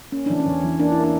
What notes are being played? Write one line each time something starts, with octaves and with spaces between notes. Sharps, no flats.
A#3 C#4
E3 D4
C#4
E2
E3
A#3 D4
A#3 E4
D4